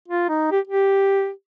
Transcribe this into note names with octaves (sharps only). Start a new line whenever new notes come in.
F4
D#4
G4
G4